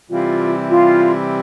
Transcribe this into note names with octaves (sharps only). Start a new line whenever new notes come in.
C3 E3 G3 C4 E4 F4
F4